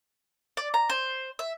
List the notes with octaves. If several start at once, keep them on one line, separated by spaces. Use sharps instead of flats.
D5
A#5
C5
E5